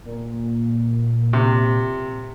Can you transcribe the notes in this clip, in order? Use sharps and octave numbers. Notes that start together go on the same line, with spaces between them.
A#2
C3